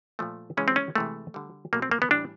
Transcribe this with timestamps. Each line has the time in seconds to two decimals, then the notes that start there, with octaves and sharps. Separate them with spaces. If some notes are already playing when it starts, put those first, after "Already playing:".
0.19 A#2 F3 A3
0.57 C#3 E3 G#3 C#4
0.68 C4
0.76 C#4
0.95 C3 E3 G#3 A3
1.34 D3 G3
1.73 B2 F#3 A3 A#3
1.82 C4
1.91 A#3
2.02 B3
2.11 A2 E3 G3 D4